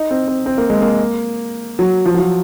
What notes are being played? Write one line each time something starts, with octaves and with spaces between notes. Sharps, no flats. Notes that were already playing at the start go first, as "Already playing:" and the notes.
Already playing: D#4
C4
C4
C4
A#3
G#3
A#3
F#3
F3
F#3
F3